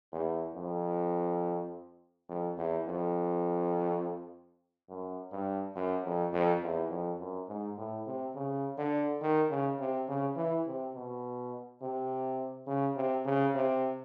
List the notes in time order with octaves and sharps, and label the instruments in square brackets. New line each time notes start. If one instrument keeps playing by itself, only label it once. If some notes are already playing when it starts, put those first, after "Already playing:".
[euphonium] E2
F2
F2
E2
F2
F#2
G2
F#2
F2
F2
E2
F2
F#2
G#2
A2
C3
C#3
D3
D#3
C#3
C3
C#3
E3
C3
B2
C3
C#3
C3
C#3
C3